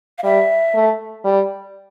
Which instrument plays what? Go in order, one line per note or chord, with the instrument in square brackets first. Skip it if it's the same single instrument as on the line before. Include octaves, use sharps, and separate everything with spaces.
[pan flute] F5
[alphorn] G3 [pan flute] E5
[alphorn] A3
G3